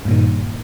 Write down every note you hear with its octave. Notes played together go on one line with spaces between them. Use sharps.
G2 A#2 D#3